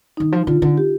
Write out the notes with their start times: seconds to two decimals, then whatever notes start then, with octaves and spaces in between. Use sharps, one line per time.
0.17 D#3 D#4
0.32 F3
0.47 D3 F4
0.62 D3
0.78 G4